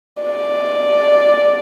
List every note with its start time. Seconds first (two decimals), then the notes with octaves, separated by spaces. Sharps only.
0.22 D5